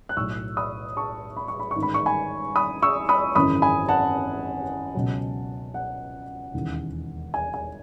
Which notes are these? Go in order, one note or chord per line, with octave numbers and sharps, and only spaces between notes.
F#6
B1 A2 F#3 C#6 E6
B5 D#6
A5 C#6
B5
C#6
B5
C#6
A1 G#2 D#3
B5
C#6
G#5 B5
B5 D#6
C#6 E6
B5 D#6
G#1 F#2 C#3 E3 B5 D#6
G#5 B5
F#5 A5
C#2 B2 F#3
F#5
E1 D#2 C#3 E3
G#5
G#5